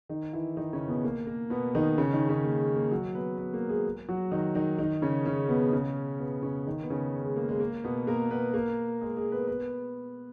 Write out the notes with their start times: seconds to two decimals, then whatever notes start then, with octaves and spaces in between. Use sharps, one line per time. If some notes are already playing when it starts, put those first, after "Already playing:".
0.09 D#3 D#4
0.33 E3 E4
0.57 D#3 D#4
0.73 C#3 C#4
0.88 B2 B3
1.04 A#3
1.27 A#3
1.50 B2 B3
1.75 D#3 D#4
1.98 C#3 C#4
2.13 D#3 D#4
2.29 C#3 C#4
2.44 A#3
2.60 G#3
2.76 A#3
2.91 F#3 F#4
3.15 B3 B4
3.38 B3 B4
3.53 A#3 A#4
3.69 G#3 G#4
4.09 F#3 F#4
4.32 D#3 D#4
4.55 D#3 D#4
4.78 D#3 D#4
5.02 C#3 C#4
5.25 C#3 C#4
5.49 B2 B3
5.72 C#3 C#4
6.20 B2 B3
6.43 C#3 C#4
6.66 D#3 D#4
6.83 B3
6.90 C#3 C#4
7.25 G#3
7.36 A#3
7.49 G#3
7.60 A#3
7.84 B2 B3
8.07 A#3 A#4
8.30 B3 B4
8.54 A#3 A#4
9.01 G#3 G#4
9.17 G#3 G#4
9.32 B3 B4
9.47 B3 B4